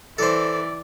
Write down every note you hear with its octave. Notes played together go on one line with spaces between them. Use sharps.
E3 A4 C5 D5